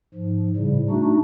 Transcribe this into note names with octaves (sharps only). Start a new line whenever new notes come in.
G#2 F3
A2 C#3 G3
A3 D4 D#4 F#4